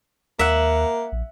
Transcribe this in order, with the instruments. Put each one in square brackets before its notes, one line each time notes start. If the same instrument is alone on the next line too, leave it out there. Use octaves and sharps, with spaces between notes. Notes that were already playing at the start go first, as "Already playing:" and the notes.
[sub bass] D#2 [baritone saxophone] A#3 [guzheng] E5 F#5
[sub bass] A#1